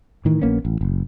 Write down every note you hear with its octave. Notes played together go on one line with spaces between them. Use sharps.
A2 D#3 E3
A#1 A#3 B3 C#4
A1
F#1